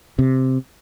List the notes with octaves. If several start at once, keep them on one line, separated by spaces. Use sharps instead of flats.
C3